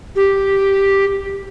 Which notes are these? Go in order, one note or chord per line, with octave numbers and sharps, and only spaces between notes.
G4